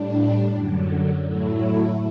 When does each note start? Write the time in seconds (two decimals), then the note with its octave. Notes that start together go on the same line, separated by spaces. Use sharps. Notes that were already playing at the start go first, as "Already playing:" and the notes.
Already playing: A2 G3 D4
0.52 F#2 D3 F#3
1.22 A2 F#3 A3 E4